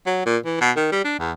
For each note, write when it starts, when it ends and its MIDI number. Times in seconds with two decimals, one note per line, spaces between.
0.06 0.21 54
0.26 0.38 46
0.45 0.60 52
0.61 0.71 47
0.76 0.90 51
0.92 1.04 55
1.05 1.16 62
1.19 1.32 40